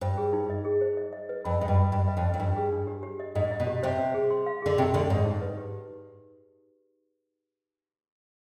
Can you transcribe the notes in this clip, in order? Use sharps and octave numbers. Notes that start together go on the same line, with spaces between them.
G2 C5
G#4
D#4
D#5
G#4
C5
D#5
D#5
B4
F2 B5
G#2 D#5
G2
B5
G2 D#5
D#5
F2
D#5
F2
G2 D4
G#4
D4
G4
G4
D#5
G#2 D#5
D#5
B2
G4
C3 C5
C5
G#4
C6
F5
D3 G#4
C3 G4
D2 D3 G4
G#2 D5
D#4
B4
G4